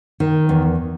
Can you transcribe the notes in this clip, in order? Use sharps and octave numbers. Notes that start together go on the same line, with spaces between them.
D#3
E2